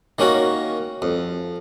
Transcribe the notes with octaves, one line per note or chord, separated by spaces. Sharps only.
D#3 A#3 C#4 F#4
F2